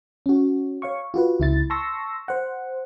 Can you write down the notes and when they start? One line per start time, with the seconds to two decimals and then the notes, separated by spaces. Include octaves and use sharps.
0.26 C#4 F#4
0.82 C#5 F5 C#6
1.14 F4 F#4 B4
1.40 C#2 E4 A6
1.70 A5 C6 C#6 E6 A#6
2.28 C5 F#5